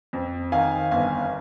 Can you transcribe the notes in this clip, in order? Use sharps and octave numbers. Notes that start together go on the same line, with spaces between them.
F2
D#3 F5 G#5
G1 F5 G#5